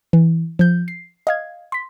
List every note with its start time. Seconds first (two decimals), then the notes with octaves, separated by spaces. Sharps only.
0.13 E3
0.59 F3 G6
0.88 C7
1.27 D#5 F5 G#6
1.72 C6 B6